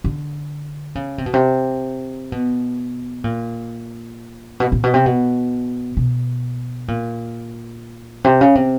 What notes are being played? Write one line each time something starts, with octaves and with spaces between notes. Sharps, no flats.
D3
C#3
C3
B2
C3
B2
A#2
B2
A#2
B2
C3
B2
B2
A#2
C3
C#3
C3